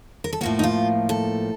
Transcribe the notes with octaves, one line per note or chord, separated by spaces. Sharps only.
A#4
A4
A2 F3 A#3 F#4
D#4
F4
A4